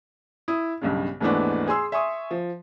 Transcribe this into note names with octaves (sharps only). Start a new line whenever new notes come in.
E4 D#6
B1 G2 C#3
D#2 G#2 E3 A3 B3 D4
G#4 G#5 C6 E6
E5 G#5 C6 C#6 D#6
F3